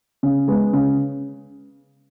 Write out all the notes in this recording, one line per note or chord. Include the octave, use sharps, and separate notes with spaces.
C#3
G#3 B3
C#3